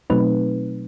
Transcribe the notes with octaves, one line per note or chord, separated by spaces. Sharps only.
B2 F#3 A3 C4 D#4 B4